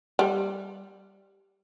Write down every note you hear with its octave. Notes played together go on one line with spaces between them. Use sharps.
G3